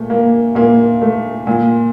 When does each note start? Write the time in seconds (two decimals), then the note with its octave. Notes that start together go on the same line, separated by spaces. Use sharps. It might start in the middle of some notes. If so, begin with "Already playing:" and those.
Already playing: A#2 A3
0.10 A#3
0.55 A#2 A#3
1.02 A3
1.47 A#2